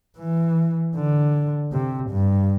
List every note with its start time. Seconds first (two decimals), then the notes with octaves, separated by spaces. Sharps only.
0.18 E3
0.95 D3
1.72 C3
2.10 G2